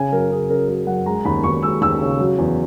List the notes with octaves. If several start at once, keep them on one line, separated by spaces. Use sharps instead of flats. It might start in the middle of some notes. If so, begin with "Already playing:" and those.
Already playing: C#3 G#5
F#2 A#4
C#3 G#4
C#3 A#4
F#3 A#4
F#2 F#5
G#3 A#5
D#2 B5
D#2 C#6
G#3 E6
D#2 E6
C#3
F#3
E2